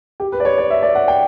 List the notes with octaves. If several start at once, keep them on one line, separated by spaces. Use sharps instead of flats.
G4
B4
D5
C#5
D5
E5
D5
F#5
G5